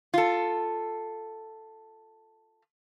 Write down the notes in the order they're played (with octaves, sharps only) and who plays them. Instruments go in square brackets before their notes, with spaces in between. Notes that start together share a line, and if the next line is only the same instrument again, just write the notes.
[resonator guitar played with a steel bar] F4 A4